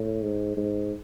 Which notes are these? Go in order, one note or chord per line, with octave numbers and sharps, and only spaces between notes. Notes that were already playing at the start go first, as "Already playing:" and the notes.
Already playing: A2
G#2
G#2